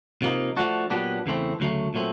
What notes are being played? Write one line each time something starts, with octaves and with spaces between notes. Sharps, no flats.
C3 F3 A#3 D#4
F3 A3 D4 F#4
A#2 F#3 B3 D4 G4
E2 C#3 E3 A3 C4
D2 C#3 F#3 A3
A#2 F#3 A3 C4